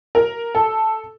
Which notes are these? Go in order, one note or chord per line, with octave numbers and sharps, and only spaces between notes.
A#4
A4